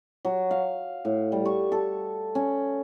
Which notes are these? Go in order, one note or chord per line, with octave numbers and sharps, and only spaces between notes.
F#3
F5
A2
G3
C#6
A4
C#4